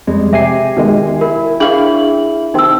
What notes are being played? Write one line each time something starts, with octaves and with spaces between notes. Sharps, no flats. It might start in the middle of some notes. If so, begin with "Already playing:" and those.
F2 G3 G#3
C3 G4 E5 G#5 C7
B2 D#3 G#3
E4 A#4
D4 E4 G#4 C#5 F5 G5 F#7
C3 D#3 C4 D#4 E6